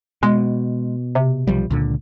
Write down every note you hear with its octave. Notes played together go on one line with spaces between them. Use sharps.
B2 G#3
C3
B1 F3 G3
C#2 A#2 D3